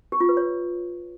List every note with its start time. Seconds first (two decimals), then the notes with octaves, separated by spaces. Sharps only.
0.12 G4
0.20 F4
0.29 B4
0.37 C#5